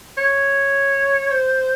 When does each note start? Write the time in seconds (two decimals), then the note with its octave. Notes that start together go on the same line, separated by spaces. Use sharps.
0.18 C#5
1.31 C5